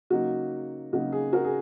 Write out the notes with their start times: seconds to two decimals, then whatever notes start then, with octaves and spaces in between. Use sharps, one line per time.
0.10 C#3 F#3 A#3 D#4 F#4
0.93 C#3 F#3 A#3 D#4 F#4
1.12 G#4
1.33 F#4 A#4
1.44 G#4